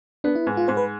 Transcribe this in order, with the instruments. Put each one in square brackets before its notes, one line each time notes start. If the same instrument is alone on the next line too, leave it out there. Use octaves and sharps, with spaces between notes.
[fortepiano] B3 [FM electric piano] D4
[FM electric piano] E4
[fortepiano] G#2
[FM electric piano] F4
[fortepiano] G#2 [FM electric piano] C5
[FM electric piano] B4